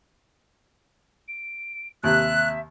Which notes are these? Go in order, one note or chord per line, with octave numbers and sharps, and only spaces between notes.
D7
D#2 C3 E5 F#6